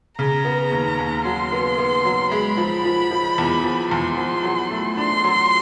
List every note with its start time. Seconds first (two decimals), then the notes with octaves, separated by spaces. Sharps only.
0.19 C#3 A#5
0.45 B3
0.72 D#2
0.99 D#2
1.25 F#3 C6
1.52 B3
1.78 B3
2.05 F#3
2.31 G#3 B5
2.57 F3
2.85 F3
3.11 F3
3.38 E2
3.64 F3
3.91 E2 C6
4.18 F3
4.44 F#3
4.71 A3
4.97 D4 C6
5.24 F#3